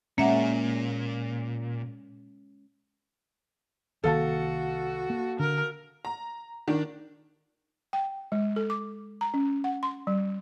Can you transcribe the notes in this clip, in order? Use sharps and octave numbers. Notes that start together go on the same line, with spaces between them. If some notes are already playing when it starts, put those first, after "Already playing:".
A#2 G#3 A#3 C#4 E5 F#5
C2 D#3 A#3 F#4 A4 F5 A5
A#3
D3 D4 A#4
A#5
D#3 D4
G5
G#3
A4
D6
A#5
C#4
F#5
C6
G3